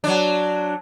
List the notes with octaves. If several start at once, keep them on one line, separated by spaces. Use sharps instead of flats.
F#3 D4